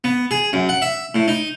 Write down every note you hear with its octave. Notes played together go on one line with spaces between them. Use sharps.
B3
G#4
F#2
F#5
E5
A2
D#4